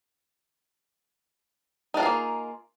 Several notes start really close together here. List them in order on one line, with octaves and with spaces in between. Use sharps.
D#4 D4 F4 G#4 A#3